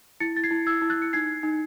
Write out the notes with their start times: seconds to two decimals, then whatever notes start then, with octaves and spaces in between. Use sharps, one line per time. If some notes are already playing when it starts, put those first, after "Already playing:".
0.20 E4 A6 C#7
0.37 A6
0.43 G#6 C7
0.51 E4
0.67 E6 G#6
0.82 E4
0.89 F#6 A6
1.02 C#7
1.13 D#4 G#6 C7
1.43 D#4